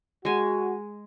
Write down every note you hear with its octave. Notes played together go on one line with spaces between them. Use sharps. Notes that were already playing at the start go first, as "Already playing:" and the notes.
G#3 F#4 G#5